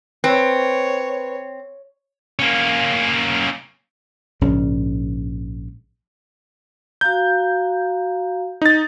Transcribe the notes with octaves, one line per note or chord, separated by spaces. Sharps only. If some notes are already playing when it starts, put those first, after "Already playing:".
C4 B4 C#5
A#3 C#4
A#1 G#2 C#3 C#4
F#4 F5 A#5 G6
D#4 A6